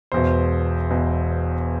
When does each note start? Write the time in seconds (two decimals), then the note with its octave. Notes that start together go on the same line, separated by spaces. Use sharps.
0.12 E1 E2 B2 C5
0.90 E1 E2 B2